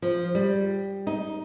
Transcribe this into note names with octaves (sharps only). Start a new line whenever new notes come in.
F3
G3
D#4